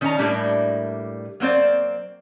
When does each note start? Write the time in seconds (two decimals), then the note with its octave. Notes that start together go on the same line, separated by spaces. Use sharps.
0.01 D#3 C#4 D4 A#4 G#5 A#5
0.18 A2 G3 A3 A#3 D4
1.40 F#3 A#3 C4 C5 D5